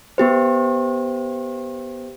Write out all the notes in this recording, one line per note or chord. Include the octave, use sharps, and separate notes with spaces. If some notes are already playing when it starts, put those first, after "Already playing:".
B3 G4 C5